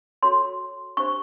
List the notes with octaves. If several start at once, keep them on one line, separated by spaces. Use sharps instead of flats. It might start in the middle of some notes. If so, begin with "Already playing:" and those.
F#4 A4 C#5 C6
D4 G4 C5 C#6